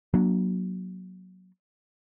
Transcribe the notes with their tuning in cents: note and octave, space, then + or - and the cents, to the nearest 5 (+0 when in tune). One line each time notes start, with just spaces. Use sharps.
F#3 +0 A#3 +30 D4 +0